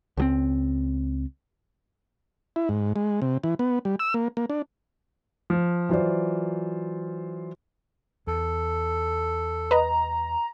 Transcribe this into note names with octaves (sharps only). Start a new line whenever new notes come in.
C#2 F3 C4
E4
G#2
G#3
C3
E3
B3
G3
E6
A#3
A#3
D4
F3
E3 F#3 F4 C5 D5
E2 A4
B4 D#5 A#5